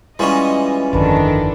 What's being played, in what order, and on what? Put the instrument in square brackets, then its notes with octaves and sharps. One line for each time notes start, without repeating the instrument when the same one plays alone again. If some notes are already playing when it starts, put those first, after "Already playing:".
[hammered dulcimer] E3 G#3 F4 [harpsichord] G3 C#4 [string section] D#5
[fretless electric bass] G1 F2 D3 [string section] D#3 D4 A4 [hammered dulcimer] B4 A5